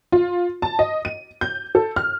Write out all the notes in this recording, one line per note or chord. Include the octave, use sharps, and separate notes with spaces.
F4
A5
D#5
D#7
G6
A4
F6